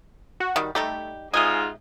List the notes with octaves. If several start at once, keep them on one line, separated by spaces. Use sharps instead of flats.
F#4
D#3 G3
G3 A3 D#4 G4
G#2 C3 F4 D#5 G#5 D#6